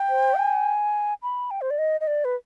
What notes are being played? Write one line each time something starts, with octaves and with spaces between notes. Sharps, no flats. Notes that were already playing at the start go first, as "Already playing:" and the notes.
Already playing: G5
C5
G#5
B5
G5
C5
D5
D#5
D#5
D5
B4